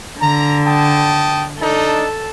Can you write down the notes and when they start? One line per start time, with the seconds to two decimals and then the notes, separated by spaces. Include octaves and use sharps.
0.20 D3 A#5
0.65 G5 A5 D#6
1.60 D4 D#4 A4